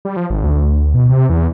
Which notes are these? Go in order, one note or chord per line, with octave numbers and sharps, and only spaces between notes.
G3
F3
G#1
D2
B2
C3
E2